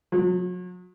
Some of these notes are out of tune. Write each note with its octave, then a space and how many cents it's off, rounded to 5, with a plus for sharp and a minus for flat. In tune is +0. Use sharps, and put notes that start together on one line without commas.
F#3 -40